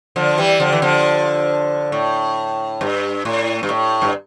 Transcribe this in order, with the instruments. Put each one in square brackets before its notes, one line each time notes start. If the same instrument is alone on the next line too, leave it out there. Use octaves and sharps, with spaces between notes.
[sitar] D3 F3
E3 G3
D3 F3
E3
D3 F3
A2
G2
A2
G2
A2
G2